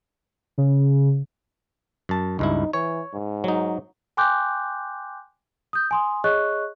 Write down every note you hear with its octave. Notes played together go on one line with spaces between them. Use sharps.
C#3
F#2 A5
C#2 G2 D#4 E4
E3 C#5
G#2
F#3 D#4
G5 G#5 C6 D6 F#6 G6
D#6 G6
G#5 C6 D#6
G#4 C#5 D#5 C#6 F#6